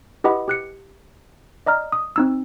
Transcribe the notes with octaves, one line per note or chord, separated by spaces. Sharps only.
E4 G4 B4 D#5 F#5 B5
G4 F#6 C#7
D5 D#5 A#5 F6
D#6
C4 D#4 E6